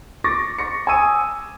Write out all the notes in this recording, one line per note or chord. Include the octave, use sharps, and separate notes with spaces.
C#6 D6 A6 A#6
C#6 A#6 C#7
G#5 D#6 E6 D#7